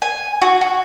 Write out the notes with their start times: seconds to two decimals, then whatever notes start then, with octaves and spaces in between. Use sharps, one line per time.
0.02 G#5
0.42 F#4
0.61 F#4